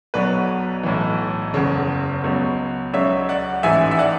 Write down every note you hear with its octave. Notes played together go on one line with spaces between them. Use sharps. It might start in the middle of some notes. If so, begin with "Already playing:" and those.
B1 B2 F#3 B4 D5
B1 A2 E3
F#1 E2 C#3
C#2 B2 F#3
C#2 C#3 F#3 C#5 E5
D5 F#5
A1 G#2 E3 E5 G#5
E5
D5 F#5